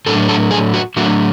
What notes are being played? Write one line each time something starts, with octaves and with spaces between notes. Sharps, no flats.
A2 F#3 A3 D4 A4
A4
G#4
F#4
A2 F#3 A3 D4 F#4